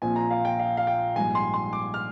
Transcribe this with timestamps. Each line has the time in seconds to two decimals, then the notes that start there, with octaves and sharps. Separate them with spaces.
0.02 A#1 A#2 F3 C4 G#5
0.16 A#5
0.30 F5
0.45 G5
0.59 F5
0.77 F5
0.87 G5
1.15 A#1 G#2 G3 G#5
1.35 C6
1.54 C6
1.73 D6
1.94 F6